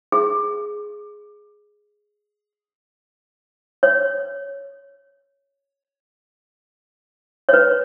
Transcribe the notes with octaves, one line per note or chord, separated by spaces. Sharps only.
G#4
C#5
C#5
B4